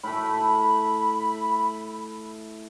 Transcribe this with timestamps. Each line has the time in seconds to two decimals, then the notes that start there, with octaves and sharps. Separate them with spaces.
0.03 A2 A3 B5